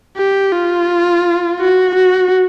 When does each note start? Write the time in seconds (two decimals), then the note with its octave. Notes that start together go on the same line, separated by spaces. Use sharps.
0.17 G4
0.52 F4
1.59 F#4
1.95 F#4